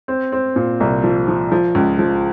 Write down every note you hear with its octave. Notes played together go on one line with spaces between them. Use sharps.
C4
C4
A#2
C2
F3
F3
F3
C#2
F3